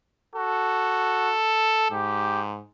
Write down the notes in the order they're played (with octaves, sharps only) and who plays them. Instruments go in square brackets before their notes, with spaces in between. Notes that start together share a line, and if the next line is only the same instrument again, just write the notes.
[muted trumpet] F#4 [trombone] A4
[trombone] G#2 [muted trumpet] G4